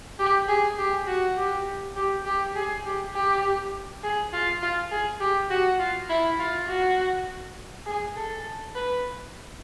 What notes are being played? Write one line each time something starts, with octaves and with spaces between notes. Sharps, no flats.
G4
G#4
G4
F#4
G4
G4
G4
G#4
G4
G4
G#4
F4
F4
G#4
G4
F#4
F4
E4
F4
F#4
G#4
A4
B4